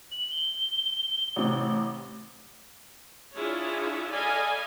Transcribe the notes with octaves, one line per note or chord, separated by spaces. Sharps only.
F#7
G7
A1 C3
D4 E4 F4 G#4 C#5
A4 D5 D#5 F5 G#5 B5